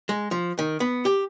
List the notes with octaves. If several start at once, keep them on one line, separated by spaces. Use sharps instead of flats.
G#3
F3
D#3
B3
G4